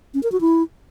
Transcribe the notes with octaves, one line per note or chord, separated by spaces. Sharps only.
C#4
A#4
F#4
E4